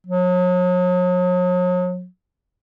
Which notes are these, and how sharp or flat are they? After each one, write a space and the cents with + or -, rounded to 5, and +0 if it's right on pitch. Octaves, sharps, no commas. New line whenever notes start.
F#3 -40